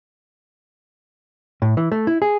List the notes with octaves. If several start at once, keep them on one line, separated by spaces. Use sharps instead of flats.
A2
E3
A3
E4
G#4